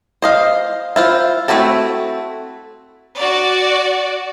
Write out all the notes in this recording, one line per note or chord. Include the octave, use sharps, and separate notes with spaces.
C5 D#5 F5
E4 F4 C5
A3 C4 E4 F#4 A4
F#4 D5